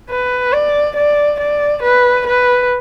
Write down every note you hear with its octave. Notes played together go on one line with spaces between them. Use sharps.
B4
D5
D5
D5
B4
B4